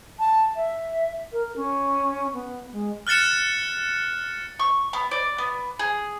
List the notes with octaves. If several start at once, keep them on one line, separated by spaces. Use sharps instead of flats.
A5
E5
A#4
C#4
B3
G#3
F6 F#6 A6 C#7 E7
C#6
B3
D5
B3
G#4